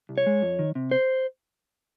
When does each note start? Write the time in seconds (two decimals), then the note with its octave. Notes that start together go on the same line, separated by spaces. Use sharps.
0.09 C2
0.18 C#5
0.26 G#3
0.42 F2
0.59 D#3
0.75 C3
0.91 C5